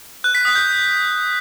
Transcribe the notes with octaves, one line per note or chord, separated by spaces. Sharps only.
F#6
B6
D#6
G6